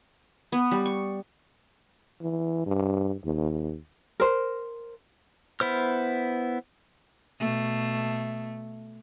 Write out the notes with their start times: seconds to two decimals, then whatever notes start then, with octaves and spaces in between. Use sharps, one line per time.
0.52 B3
0.71 G3
0.86 C#6
2.21 E3
2.66 G2
3.25 D#2
4.20 A#4 C5
5.60 B3 E4 C5 F6
7.40 B2 A3